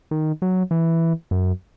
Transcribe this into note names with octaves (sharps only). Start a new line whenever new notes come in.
D#3
F#3
E3
F#2